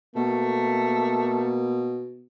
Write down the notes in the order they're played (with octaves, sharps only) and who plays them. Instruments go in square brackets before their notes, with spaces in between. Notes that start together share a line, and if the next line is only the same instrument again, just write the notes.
[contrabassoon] B2 [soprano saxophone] A3 [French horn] A#3